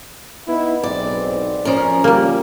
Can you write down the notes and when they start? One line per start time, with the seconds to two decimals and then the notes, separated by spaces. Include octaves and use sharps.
0.48 B3 D#4 E4
0.83 B1 G#2 C4 D5
1.65 F3 C#4 A#4
2.04 G3 A#3